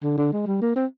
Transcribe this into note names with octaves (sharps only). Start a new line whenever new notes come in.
D3
D3
G#3
G3
A#3
C4